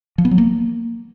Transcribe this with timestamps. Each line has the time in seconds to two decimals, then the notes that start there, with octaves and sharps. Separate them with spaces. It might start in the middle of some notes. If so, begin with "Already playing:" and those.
0.18 F3
0.25 B3
0.31 F#3
0.38 A#3